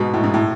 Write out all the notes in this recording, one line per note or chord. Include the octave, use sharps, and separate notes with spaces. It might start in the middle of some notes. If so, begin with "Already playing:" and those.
Already playing: G#2 B2
A2
G#2
A2